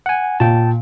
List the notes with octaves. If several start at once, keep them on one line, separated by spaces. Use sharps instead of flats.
F#5 G#5
A#2 G5 A5